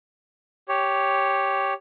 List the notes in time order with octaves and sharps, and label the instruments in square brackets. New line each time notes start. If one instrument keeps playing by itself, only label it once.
[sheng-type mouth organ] G4 C#5